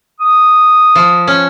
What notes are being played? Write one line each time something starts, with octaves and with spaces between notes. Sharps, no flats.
D#6
F3
C#4